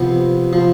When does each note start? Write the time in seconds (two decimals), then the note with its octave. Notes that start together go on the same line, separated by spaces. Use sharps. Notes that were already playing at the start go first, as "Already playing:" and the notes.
Already playing: C3 F3 B3
0.53 F3